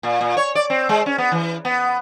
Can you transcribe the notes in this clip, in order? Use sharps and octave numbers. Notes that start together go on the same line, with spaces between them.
A#2
A#2
C#5
D5
C4
G#3
C#4
B3
E3
B3